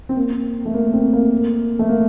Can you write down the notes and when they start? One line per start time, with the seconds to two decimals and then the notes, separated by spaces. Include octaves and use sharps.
0.09 C4
0.16 A#3
0.65 A3
0.75 A#3
0.93 C4
1.13 A#3
1.79 A3
1.89 A#3